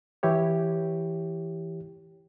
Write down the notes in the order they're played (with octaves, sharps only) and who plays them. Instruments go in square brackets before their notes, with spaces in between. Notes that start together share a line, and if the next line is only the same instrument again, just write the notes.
[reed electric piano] E3 E4 G4 C#5